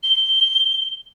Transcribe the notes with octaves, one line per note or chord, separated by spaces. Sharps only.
G7